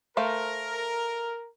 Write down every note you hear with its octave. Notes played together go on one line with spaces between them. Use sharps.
A3 A#4 C5 F5